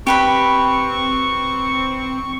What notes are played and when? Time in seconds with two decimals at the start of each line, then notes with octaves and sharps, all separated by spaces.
0.07 C4 G4 B4 B5 C#6